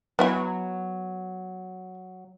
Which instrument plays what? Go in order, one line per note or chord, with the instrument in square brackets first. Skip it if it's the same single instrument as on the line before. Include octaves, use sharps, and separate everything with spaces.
[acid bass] F#3 [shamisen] B3 E4 G#5